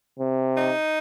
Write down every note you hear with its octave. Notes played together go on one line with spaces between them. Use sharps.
C3
D#4